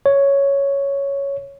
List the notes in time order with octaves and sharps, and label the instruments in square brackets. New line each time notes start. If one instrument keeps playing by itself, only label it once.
[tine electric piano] C#5